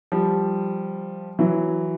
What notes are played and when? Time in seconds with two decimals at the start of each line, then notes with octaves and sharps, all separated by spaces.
0.12 F3 G3
1.39 E3 F#3